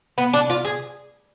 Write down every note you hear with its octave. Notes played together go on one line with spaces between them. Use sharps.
B3
D4
F4
G#4